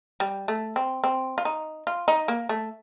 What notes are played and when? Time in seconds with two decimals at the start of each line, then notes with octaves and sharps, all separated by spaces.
0.20 G3
0.48 A3
0.76 C4
1.04 C4
1.38 F4
1.45 D#4
1.87 F4
2.08 D#4
2.28 A#3
2.49 A3